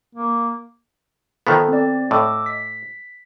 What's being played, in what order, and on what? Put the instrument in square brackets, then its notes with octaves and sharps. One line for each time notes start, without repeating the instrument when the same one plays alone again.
[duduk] A#3
[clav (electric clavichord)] D#3 F3 B3 [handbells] A4
[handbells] C4 D5
[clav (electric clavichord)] A2 [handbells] D#5 D6 E6
[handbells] B6